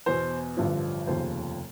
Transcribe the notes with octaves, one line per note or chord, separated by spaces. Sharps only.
E2 B2 C5
A1 G2 D3 F3
F1 D#2 C#3 F3 C5